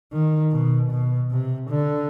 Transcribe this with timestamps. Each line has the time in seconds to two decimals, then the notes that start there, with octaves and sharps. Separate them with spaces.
0.13 D#3
0.52 B2
0.91 B2
1.31 C3
1.70 D3